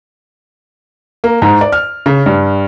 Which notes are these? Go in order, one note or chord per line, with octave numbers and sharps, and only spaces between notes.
A#3
G#2
D5
F6
C#3
G2